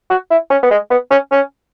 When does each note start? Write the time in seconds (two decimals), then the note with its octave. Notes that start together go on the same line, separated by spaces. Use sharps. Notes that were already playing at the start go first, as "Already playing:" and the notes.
0.10 F#4
0.30 E4
0.50 C#4
0.63 B3
0.71 G#3
0.90 B3
1.10 C#4
1.31 C#4